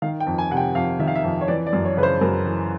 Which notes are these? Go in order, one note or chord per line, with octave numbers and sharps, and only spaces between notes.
D#3 F5
G5
F2
G#5
C3 F#5
G5
F2 F5
D#3 E5
F5
E5
F2
C#5
E3 D5
D5
F#2
C#5
C#3 B4
C5
F#2 A#4
E3